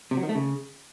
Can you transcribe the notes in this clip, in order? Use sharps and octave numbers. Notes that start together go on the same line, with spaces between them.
C3
F#3
D#3
A3
C#3